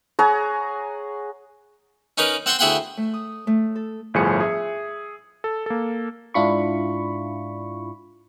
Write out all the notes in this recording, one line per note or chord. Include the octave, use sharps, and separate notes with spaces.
G#4 C#5 F#5 A#5
C#4 D#4 A#4 B4
C4 F#5 G5 C6 C#6
D2 E4 G#4 F#5 G5 C6
A3
D#6
A3
A4
G1 A2 F3 G#4 G#5 C#7
G#4 E5
A4
A#3 A4
G#2 D4 E4 F4 B5 C#6